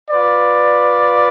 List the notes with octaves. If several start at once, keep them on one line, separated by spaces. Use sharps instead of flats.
F4 B4 D5